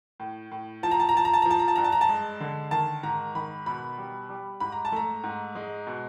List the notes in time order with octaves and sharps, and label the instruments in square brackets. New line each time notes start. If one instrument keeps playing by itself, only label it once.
[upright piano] A2
A2
F3 A5
A#5
A5
A#5
F3 A5
A#5
A5
F3 A#5
A5
A#5
A5
G2 A#5
A5
A#5
A5
G#3
D3
D#3 A5
G#2 A#5
D#3 B5
B2 B5
G3
G3
G#2 B5
A#5
A5
A3 A#5
G#2
G#3
B2